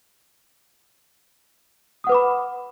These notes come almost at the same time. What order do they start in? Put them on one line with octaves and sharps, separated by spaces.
D#6 F#5 B4 D6 B5